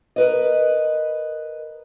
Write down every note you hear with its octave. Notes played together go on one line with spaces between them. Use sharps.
A#4 B4 D#5